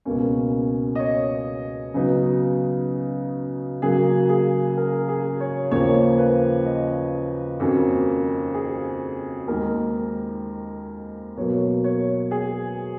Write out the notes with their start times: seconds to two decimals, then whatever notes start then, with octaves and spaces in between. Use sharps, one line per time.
0.05 C#2 B2 A#3 C#4
0.95 D#5
0.99 C#5
1.94 C#3 F#3 B3 D#4
3.82 C#3 F#3 A#3 G#4
4.29 G#4
4.77 A#4
5.08 G#4
5.40 C#5
5.71 D#2 C#3 F3 A#3 C#5
6.18 B4
6.66 D#5
7.60 F2 D#3 A#3 C#4 F#4
8.54 G#4
9.48 D#2 D#3 G#3 A#4
11.37 B2 F#3 A#3 C#5
11.84 C#5
12.31 G#4